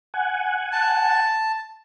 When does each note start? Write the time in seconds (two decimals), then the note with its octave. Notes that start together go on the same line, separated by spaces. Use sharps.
0.14 F#5 G#5
0.73 A5